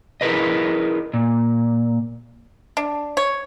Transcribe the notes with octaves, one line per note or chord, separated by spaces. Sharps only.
E4 G#4 A#4 B4 D#5
A#2
D4
C#5